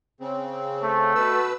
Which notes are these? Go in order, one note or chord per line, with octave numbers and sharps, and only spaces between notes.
C#3 C4
A3
B2 B4 E6